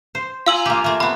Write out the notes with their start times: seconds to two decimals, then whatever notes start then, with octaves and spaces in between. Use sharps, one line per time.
0.15 C5
0.46 F4 F5 G#5 A#5 E6 F#7
0.66 A#3 G4
0.84 A3 A#3
1.00 B3 C4 B5